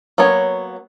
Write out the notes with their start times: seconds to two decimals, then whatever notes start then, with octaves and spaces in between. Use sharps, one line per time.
0.18 F#3 A#3 B3 C#5